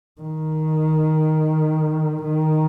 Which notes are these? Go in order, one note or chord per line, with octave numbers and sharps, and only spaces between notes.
D#3
D#3